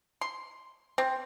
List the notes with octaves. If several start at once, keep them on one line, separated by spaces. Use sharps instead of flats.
C6
C4